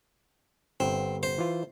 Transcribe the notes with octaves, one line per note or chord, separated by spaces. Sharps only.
G1 C4
C5
E3 F4